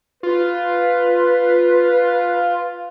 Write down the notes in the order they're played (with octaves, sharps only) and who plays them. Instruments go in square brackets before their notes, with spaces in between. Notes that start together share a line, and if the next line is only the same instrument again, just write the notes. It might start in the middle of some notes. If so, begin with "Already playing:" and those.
[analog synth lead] F4 [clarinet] B4